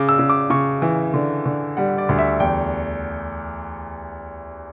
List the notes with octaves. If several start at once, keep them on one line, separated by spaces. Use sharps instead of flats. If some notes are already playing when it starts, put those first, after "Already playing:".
Already playing: C#3 D6
E6
C#3
D6
C#3 C#6
E3
D3
D3
G3 F#5
D5
D2
E5
E2 G5